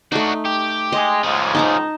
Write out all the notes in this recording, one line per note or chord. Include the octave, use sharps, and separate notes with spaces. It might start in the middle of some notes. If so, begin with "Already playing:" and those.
A3 D4 D#4 F#4
G4
G#3 D#5
C#2 G#2 F3 G#4
D#4 A5 A#5